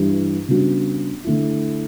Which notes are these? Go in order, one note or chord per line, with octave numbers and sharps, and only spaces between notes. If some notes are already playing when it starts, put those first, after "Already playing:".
Already playing: G2 E3 G3 D4 G4
C#3 G3 B3 D4 F#4
D3 A3 E4